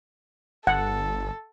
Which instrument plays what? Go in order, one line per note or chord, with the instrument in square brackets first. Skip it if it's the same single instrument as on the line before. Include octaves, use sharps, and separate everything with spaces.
[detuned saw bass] G1 [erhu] A4 [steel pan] F#5